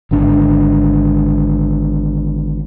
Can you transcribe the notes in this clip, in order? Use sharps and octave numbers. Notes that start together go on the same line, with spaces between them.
G#1 G#2 D3 D4